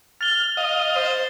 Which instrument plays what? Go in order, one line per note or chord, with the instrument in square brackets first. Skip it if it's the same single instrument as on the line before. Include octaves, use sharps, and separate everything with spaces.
[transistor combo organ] F6 [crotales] A6 G7
[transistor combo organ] D#5 F5
[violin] C5